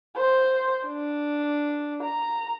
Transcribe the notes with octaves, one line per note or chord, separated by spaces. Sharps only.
C5
D4
A#5